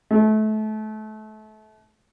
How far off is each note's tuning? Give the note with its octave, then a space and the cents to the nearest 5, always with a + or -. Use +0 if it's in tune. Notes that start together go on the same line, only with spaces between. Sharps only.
A3 -30